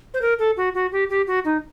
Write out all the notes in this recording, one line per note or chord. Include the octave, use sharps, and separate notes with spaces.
C5
A#4
A4
F#4
F#4
G4
G4
F#4
D#4